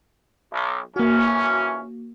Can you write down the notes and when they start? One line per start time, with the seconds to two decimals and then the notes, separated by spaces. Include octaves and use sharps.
0.52 B1
0.96 A#1 E3 A#3 C#4 F#4